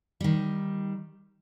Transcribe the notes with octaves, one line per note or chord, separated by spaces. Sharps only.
D#3 G3